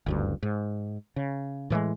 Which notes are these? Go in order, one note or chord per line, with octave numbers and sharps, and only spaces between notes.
F#1 D2 G2
G#2
C#3
A2 E3 F#3 G#3